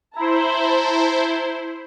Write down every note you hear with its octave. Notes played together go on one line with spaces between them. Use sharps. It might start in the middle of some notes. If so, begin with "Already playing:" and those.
E4 C5 A5 A#5